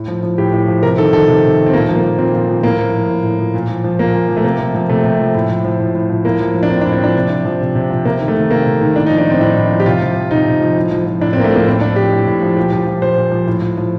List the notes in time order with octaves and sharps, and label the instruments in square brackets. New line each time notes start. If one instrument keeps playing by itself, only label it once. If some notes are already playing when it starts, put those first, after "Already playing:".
Already playing: [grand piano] A2
F3
F3
A2 G4
A2
F3
C3 A#4
D#3 A4
D#3 A4
C3
C3
D#3
C4
A#2 A#3
F3
A#3
F3
A#2 C4
A#2
F3
A2 A#3
F3
F3
A2
A2
F3
A#2
F3
F3
A#2 A#3
A#2
F3
A3
C3 A#3
F3
F3
C3 A3
C3
F3
A2
F3
F3
A2
A2
F3
A2 A#3
F3
F3
D4
A2 C4
D4
A2
C4
F3 D4
C3
F3
F3
C3
C3
F3
C3 A#3
D#3
A3
D#3
C3 A#3
C3
D#3
A2 D4
D#4
F3
D4
F3 C4
A2 D4
A2
F3
G4
C3 F4
F3
F3
C3 D#4
C3
F3
A2
F3
F3
A2 D4
C4
A2 A#3
A3
F3 A#3
A2 C4
F3 D4
F3 G4
A2
A2
F3
A#2 G4
F3
F3
A#2 C5
A#2
F3
A2
F3
F3